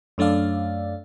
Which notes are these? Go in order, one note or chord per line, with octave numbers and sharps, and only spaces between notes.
F#2 A3 D4 D5 F5